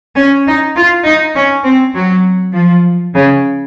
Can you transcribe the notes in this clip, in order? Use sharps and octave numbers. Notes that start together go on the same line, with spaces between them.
C#4
D#4
F4
D#4
C#4
C4
F#3
F3
C#3